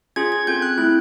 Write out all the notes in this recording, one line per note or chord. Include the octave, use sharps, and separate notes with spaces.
C#4 F4 G#4 G#6
G#6
C4 F4 A4 G6
F#6
A3 C4 E4 F#6